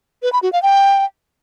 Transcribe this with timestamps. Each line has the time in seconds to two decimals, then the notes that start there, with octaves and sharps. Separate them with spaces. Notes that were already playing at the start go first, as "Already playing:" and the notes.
0.23 B4
0.33 B5
0.43 F#4
0.53 F5
0.63 G5